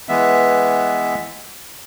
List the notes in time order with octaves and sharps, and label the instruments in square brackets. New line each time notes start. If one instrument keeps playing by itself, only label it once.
[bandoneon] E3 G#3 B3 E5